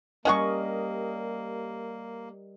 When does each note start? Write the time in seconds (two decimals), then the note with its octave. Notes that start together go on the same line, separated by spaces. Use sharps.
0.25 G3 A#3 C#4 A#4 D#5 F#5 C#6